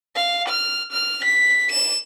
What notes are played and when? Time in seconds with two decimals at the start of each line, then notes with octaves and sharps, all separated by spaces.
0.15 F5
0.48 F6
0.92 F6
1.24 B6
1.72 E7